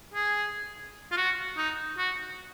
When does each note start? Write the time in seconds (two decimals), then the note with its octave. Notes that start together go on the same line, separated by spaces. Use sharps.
0.14 G#4
1.12 F4
1.17 F#4
1.57 D#4
1.98 F#4